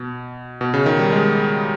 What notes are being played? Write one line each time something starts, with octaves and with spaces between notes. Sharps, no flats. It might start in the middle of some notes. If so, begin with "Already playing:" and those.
Already playing: B2
B2
C#3
D#3
G3
G#3